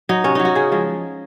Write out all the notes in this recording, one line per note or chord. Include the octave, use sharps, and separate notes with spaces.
F#3 D#4
C3 C#4
F#3 D#4
F#4
C#3 G#4
F3 G#3